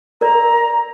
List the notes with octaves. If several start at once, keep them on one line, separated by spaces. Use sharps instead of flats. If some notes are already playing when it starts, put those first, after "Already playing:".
A#4 D5 A#5